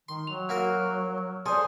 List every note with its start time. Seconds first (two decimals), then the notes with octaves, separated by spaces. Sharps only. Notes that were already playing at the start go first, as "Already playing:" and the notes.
0.09 D#3 C6
0.27 F#3 F7
0.49 A#3 F#4 A#4
1.46 G#4 A4 C5 D5 C6